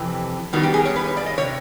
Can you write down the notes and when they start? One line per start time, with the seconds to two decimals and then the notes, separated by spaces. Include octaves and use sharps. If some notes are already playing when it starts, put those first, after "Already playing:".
Already playing: F2 C3 E3
0.53 F#2 D#3 G3 B3 F#4
0.63 G4
0.74 G#4
0.85 C#5
0.96 B4
1.06 C#5
1.17 D5
1.26 D#5
1.38 C3 C#5